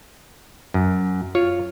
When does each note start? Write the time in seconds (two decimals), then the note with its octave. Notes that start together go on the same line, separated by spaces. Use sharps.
0.74 F#2
1.35 F4 C#5